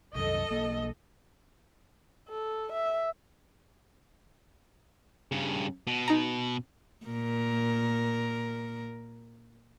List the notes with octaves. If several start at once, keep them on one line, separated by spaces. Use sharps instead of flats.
C2 F#2 A4 D#5
B1 A#3
A4
E5
G2 C#3
B2
D#4 A#5
A#2 A#4